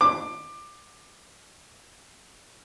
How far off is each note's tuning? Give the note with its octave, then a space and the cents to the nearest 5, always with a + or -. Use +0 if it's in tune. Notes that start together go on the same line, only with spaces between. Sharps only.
D6 +20